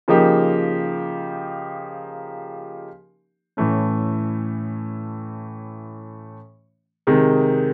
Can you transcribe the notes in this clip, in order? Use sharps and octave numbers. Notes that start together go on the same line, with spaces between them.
C#3 F3 A#3 D#4 G4
A2 E3 A3 C#4
C3 D#3 G#3